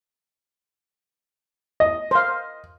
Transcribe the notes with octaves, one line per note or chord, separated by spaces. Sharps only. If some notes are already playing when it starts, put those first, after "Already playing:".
D#5
C5 F5